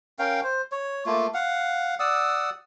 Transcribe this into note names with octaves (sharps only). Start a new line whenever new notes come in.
C#4 A#4 F5 G5
C5
C#5
A3 A#3 F4
F5 F#5
D5 F#5 D#6 E6